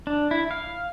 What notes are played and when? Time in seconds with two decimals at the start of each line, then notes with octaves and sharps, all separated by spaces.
0.07 D4
0.31 E4
0.51 F5